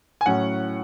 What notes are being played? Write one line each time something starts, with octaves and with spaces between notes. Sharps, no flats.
G#5
A2 F#3 C#4 F#5